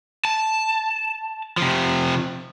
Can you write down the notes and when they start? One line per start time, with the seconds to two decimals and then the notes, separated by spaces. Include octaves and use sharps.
0.25 A5
1.57 C3 F3